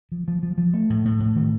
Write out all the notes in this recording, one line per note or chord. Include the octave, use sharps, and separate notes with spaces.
F3
F3
F3
F3
A3
A2
A2
A2
D#3